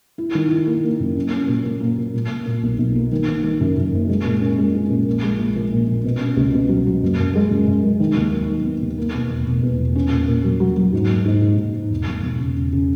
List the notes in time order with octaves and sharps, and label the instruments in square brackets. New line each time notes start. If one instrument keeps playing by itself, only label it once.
[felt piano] E4
D#3
E4
A#3
A#3
F#2
C#4
C#4
A#2
A#2
A#3
A#2
A#2
A#2
A#2
B1
B1
A#3
D#3
D#3
D#3
F#2
F#2
F#1
G#3
A#2
C#4
G#3
C#4
A#2
A#1
G#3
A#1
A#2
A#1
A#2
B2
C#4
C#2
B2
F#3
F#3
F#1
F#2
G#3
F#2
F#2
G#3
D#3
D#2
F#3
D#3
B3
D#2
A#3
B2
E1
E1
E2
E1
C#4
A#2
A#2
F#3
F#3
F#3
G#2
A#3
G#2
G#2
G#2
G#2
E1
E1
E1
C#3
C#3
C#3